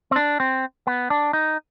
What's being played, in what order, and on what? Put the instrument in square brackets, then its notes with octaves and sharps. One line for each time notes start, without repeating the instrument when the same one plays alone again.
[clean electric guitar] C4
D4
C4
B3
D4
D#4